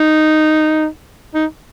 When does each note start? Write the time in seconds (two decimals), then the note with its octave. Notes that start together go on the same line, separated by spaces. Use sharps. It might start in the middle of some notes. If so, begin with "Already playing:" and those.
Already playing: D#4
1.35 D#4